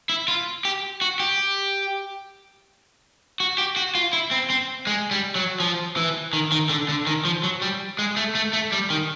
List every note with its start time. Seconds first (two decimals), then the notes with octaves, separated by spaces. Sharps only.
0.09 E4
0.28 F4
0.65 G4
1.01 F#4
1.20 G4
3.40 F#4
3.58 G4
3.76 F#4
3.95 F4
4.13 E4
4.31 C4
4.50 C4
4.87 G#3
5.11 G3
5.35 F#3
5.60 F3
5.97 E3
6.33 D#3
6.52 D#3
6.70 D3
6.89 D3
7.07 D#3
7.25 F3
7.44 F#3
7.62 G3
7.99 G#3
8.17 A3
8.35 A3
8.53 A3
8.72 G3
8.90 D#3